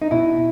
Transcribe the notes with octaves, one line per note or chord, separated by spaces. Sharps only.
D#4
B2 E4